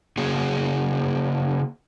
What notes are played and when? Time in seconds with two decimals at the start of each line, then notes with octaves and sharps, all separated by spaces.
0.17 C#3 A#3 F#4 G#4